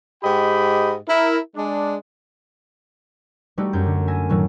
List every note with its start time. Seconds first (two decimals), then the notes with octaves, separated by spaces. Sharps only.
0.23 G#2 G4 D#5 G5 B5
1.08 E4 A#4
1.56 G#3 D4
3.58 G3 A3 D#4 F#4 G4
3.73 F#2 G6
3.86 D3
4.07 E5 G#5 A#6
4.29 A2 D#3 F#3 A3